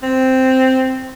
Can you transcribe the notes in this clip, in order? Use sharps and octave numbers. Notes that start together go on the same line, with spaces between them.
C4